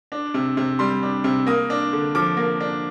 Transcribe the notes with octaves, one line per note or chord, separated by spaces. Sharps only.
D4
C3
C3
G3 C6
D4
C3
A#3 D#6
D4
D3
F3 D6
A#3
D4